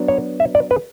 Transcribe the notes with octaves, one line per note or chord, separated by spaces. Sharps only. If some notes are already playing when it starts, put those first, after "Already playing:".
Already playing: F#3 B3 D4
C#5
E5
D5
B4